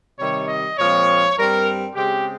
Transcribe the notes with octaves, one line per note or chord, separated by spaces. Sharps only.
C3 D#3 G3 C#5
D#5
A#2 F3 G#3 C4 C#5
G2 G3 C4 A#4
C#3 G#3 C4 G4